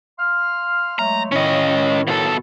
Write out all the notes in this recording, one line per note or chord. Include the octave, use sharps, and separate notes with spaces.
F5 C6 F6
F#3 G#3 A3 A#5
A2 D#3 C#4 D#5
B2 A4